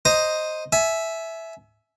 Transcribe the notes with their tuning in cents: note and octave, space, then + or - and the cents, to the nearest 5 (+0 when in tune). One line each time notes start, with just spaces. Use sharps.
C5 +0 D#5 +0 A#5 +0
E5 +0 G#5 +35